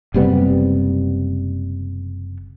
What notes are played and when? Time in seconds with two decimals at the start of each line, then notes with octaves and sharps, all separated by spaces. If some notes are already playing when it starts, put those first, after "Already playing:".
0.14 F#1 C3 G3 B3